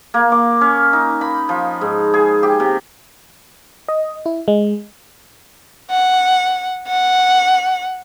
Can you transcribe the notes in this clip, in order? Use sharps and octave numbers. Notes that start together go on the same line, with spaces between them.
A#3
D6
C#4
D#4
B5
F3
G#2
G#4
G4
C3
D#5
E4
G#3
F#5
F#5